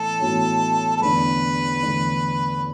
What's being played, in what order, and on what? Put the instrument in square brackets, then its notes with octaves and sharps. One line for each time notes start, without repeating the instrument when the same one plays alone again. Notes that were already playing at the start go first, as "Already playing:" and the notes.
Already playing: [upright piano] A2 E3 B3 C#5 [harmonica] A4
[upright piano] A2 E3 B3 F#4 C#5
[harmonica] A4
[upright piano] E2 D3 A3 D4 [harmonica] B4
[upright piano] E2 D3 A3 D4